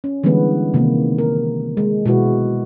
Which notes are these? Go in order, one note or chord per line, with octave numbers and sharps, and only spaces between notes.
C#4
D3 E3 G3 G#3 B3 B4
C3 D#3 A#3
A#4
G#3
B2 G#3 E4 F#4 B4